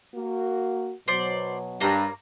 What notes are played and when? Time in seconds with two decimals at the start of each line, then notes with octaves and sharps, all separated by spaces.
0.15 A#3 F#4
1.08 B2 F#3 C5 D5
1.81 G2 A#3 C#4 A#5